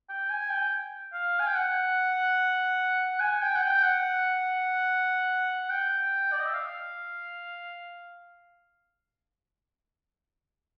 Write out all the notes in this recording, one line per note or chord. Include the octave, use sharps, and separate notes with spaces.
G5
G#5
G5
F5
G#5
G5
F#5
G#5
G5
F#5
G5
F#5
G5
D5
D#5
E5
F5